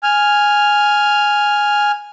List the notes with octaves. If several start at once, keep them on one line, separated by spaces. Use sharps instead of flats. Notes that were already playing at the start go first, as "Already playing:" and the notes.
G#5 F6